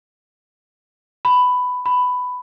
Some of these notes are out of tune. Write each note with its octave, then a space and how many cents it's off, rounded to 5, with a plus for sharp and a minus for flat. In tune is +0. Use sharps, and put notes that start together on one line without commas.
B5 +10
B5 +10